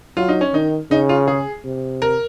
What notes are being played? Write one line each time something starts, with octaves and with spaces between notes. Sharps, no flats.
F#3 F4
D#4
C#4
D#3 D#4
C#3 D#4
F4
G#4
C3
A#4